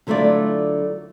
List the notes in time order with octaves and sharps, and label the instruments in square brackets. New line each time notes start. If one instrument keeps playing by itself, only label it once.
[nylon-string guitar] D3 F#3 A3 E4 F4 D5